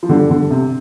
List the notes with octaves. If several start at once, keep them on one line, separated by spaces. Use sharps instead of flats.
F3
D3 G3
D3
C3